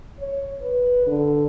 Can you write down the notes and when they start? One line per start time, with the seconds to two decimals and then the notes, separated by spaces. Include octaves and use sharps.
0.20 C#5
0.62 B4
1.07 D3